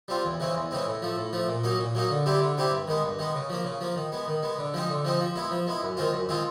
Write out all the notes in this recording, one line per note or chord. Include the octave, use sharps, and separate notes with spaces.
G3 C4 F4
E2
C#3 E3 G#3 C4
E2
C#3 E3 G#3 C4
A2
F3 A3
A2
F3 A3
A#2
F#3 A#3 D#4
A#2
F#3 A#3 D#4
D3
G3 C4 E4 G4
D3
G3 C4 E4 G4
G2
D#3 G#3 B3
G2
D#3 G#3 B3
C#3
F3 A#3
C#3
F3 A#3
D#3
G#3 B3
D#3
G#3 B3
D3
F3 G#3 C4 D#4
D3
F3 G#3 C4 D#4
F3
G#3 B3 E4
F3
G#3 B3 E4
F#2
D#3 G#3 C4 F4
F#2
D#3 G#3 C4 F4